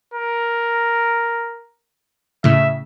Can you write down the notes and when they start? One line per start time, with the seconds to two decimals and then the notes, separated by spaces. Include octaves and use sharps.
0.14 A#4
2.44 A2 C#3 E5